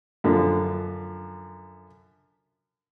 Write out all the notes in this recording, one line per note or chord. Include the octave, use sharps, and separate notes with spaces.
F#2 D3 F3